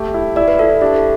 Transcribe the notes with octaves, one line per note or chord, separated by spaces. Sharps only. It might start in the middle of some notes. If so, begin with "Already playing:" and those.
Already playing: A3 G4
E4
E4 D5
B4
E4 A4
A4
D4 G4
A4